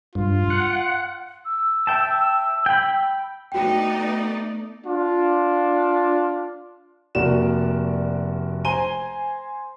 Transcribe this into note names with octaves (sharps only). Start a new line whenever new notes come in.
G2 F4
F#5
E6
E5 G5 A5
G5 B5
A3 B3 D#4 F#4 D5 G5
D4 F4
F1 A#3 F#4 D5 E7
C5 G#5 A#5 C6 D#7 G7